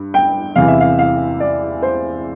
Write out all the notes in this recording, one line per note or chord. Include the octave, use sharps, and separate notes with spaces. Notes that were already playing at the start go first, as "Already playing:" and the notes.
Already playing: G2
G5
E2 C3 E3 F5
E5
F5
F5
D5
C5